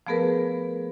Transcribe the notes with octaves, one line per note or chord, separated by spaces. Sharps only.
F3 A3 B3 G#4 A#4 B4